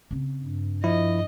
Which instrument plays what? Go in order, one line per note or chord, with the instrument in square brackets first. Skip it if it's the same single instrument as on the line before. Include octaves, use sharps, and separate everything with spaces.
[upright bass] C#3 C4
[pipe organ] G2
[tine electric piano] F3 E4 [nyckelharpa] D#5